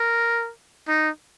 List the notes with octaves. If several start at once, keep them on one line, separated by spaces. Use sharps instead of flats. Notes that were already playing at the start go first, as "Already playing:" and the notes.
Already playing: A#4
D#4